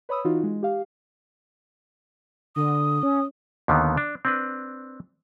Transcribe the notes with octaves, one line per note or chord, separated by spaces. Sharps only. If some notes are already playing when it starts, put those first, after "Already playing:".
B4 C#5 B5 D#6 E6
E3 D#4 F4 F#4
G#3
G4 F5
D3 D#6
C#4
D#2 D3 D#3 B3
D4
C4 D4 B4